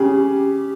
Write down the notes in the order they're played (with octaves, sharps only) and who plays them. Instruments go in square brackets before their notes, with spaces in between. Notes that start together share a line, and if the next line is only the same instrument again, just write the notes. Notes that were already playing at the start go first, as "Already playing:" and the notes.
Already playing: [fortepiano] C#3 [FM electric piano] G4